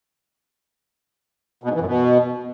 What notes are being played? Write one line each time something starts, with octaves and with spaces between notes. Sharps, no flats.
B2
G#2
E3
F#2
B2